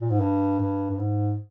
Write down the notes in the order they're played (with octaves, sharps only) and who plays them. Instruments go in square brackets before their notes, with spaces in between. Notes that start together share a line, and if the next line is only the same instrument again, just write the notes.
[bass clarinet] A#2
G#2
G2
G2
G2
G#2